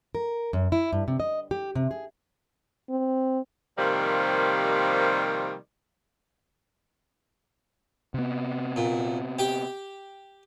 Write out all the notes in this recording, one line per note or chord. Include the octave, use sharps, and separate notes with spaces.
A#4
F#2
E4
G2
C3
D#5
G4
C3
G#4
C4
C3 D#3 F3 G3 A#3
C3 B3
A#2
G4 G5